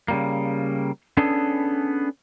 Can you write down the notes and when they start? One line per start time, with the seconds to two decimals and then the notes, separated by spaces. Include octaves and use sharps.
0.08 C#3 G3 A#3
1.17 B3 C#4 D4 G#4 A4 B4